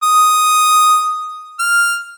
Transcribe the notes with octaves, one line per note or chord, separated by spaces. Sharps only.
D#6
F6